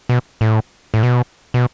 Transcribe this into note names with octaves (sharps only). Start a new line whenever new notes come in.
B2
A2
A2
B2
B2